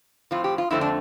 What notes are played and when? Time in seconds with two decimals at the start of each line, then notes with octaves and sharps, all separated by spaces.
0.31 A2 F3 C4 F4
0.44 G4
0.58 F4
0.71 F2 D3 A3 C4 E4
0.81 D4